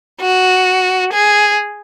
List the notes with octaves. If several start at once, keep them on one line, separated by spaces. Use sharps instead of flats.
F#4
G#4